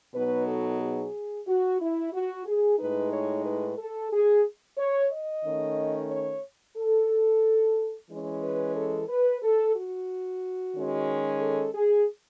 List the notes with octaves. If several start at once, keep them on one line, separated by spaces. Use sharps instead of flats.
B2 F#3 B3 D#4 B4
A4
G#4
F#4
E4
F#4
G#4
A2 G#3 D#4 B4
C#5
B4
A4
G#4
C#5
D#5
D#3 A3 C#4
C#5
A4
E3 G#3 C#4
B4
A4
B4
A4
F#4
D#3 G#3 C#4
A4
G#4